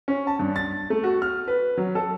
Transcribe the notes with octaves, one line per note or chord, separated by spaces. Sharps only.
C#4
A5
G2
A6
A3
F#4
F6
B4
F#3
A4